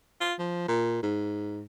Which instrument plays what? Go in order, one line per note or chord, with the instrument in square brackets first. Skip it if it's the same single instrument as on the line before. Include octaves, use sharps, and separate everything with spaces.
[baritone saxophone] F4
F3
A#2
G#2